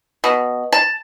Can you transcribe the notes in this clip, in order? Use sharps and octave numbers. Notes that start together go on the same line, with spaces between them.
B2
A5